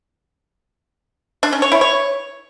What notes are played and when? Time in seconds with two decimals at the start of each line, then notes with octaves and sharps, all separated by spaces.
1.43 D4
1.52 C#4
1.62 C#5
1.72 E4
1.81 C#5